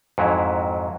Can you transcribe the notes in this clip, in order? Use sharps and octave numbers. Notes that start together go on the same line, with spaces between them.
F2 G#2 F#3 E4